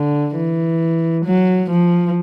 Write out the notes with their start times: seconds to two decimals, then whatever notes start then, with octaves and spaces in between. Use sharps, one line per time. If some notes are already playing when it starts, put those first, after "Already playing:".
Already playing: D3
0.37 E3
1.26 F#3
1.70 F3